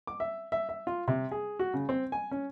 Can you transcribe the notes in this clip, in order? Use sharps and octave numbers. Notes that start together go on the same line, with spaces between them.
D6
E5
E5
E5
F4
C3
G#4
F#4
C#3
C4
G#5
C#4